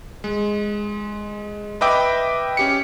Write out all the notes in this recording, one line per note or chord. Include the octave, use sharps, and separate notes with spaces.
G#3
B4 D#5 E5 G5 D6
C#4 G4 C#7